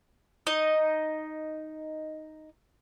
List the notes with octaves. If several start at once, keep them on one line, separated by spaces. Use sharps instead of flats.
D#4 D#5